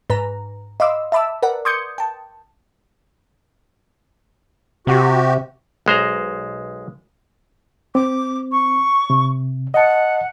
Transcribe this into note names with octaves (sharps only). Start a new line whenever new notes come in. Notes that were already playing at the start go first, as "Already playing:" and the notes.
G#2 B4 A#5
D#5 F5 B5 C6 D6 E6
E5 A5 B5 D6 E6
A#4 B4 D5 F#5
C6 D6 D#6 G6 G#6 C#7
G5 A5
C3 F#4 G4
B1 G#3 C5 A#5
C4 D6
C#6
C3
D#5 F#5 A5